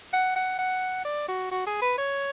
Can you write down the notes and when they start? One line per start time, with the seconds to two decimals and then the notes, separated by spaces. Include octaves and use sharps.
0.13 F#5
0.36 F#5
0.59 F#5
1.05 D5
1.28 F#4
1.51 F#4
1.67 G#4
1.82 B4
1.98 C#5